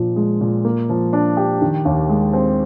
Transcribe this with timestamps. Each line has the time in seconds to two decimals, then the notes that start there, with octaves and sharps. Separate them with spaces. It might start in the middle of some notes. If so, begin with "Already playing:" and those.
Already playing: A#2 F3
0.16 G#3
0.41 A#2
0.65 A#3
0.89 F3
1.13 D4
1.37 G4
1.62 D#3
1.85 D#2
2.09 G#3
2.33 C4